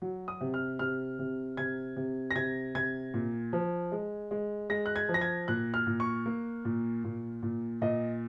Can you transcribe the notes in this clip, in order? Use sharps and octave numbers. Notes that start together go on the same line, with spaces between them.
F#3
D#6
C3
F6
C3 F6
C3
C3 G#6
C3
A#6
C3 G#6
C3 G#6
A#2
F3
G#3
G#3
G#3 A#6
F#6
G#6
F3
A#6
G#6
A#2 F#6
F6
A#2
C#6
A#3
A#2
A#2
A#2
A#2 D#5